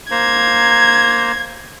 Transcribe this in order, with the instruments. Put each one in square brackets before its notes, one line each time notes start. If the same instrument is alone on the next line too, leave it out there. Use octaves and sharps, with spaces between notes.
[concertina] A#3 C5 A#5 [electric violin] G#6